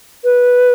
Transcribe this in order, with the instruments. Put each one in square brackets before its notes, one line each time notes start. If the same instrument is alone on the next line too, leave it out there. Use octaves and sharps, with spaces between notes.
[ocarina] B4